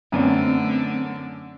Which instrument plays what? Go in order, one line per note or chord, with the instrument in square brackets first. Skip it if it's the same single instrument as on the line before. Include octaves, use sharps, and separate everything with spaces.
[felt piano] F#2 B3 D4 [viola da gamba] D3 [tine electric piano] A3 C4